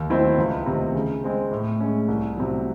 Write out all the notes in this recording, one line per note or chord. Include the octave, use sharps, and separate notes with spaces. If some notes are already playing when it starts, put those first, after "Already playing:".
Already playing: D#2
D#3 F#3 C4 E4
C#2
C3 D#3
C#3
G#3 C4
A2
G#3 C#4
C2
C3 F#3